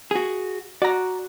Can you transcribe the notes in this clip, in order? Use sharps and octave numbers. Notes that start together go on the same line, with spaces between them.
F#4 G#4
F#4 D5 A#5